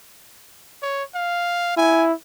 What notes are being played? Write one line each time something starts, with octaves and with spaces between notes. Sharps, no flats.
C#5
F5
E4 G#5